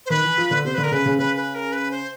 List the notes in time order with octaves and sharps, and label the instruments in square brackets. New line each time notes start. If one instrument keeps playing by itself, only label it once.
[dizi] C5
[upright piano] D#3 [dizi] B4
[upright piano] E3
F3
D3
[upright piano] C3 [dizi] C5
[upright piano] D3 [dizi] B4
[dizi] A#4
[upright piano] C#3 [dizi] B4
[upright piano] C#3
[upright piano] C#3 [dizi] B4
[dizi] B4
A#4
B4
C5